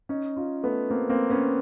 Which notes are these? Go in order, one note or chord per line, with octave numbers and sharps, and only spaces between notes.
C#4 D#4
D#4 F4
A3 B3
A#3 C4
A#3 C4
B3 C#4